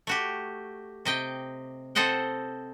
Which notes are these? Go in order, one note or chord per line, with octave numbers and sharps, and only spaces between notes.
A3 F#4 G4
C3 D#5 G5
C4 A4 C5 D#5 F#5 G5